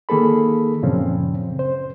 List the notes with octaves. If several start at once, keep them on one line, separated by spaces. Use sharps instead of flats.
D#3 A#3 G#4 A4 B5
F#2 A#2 C#3 F3 C4 C#4
C5